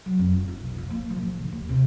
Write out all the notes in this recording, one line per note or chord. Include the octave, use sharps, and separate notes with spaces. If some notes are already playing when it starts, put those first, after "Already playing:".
F#3
F2
F4
D#4
B1
F2
A#3
F3
G#2
D3
D#2
C3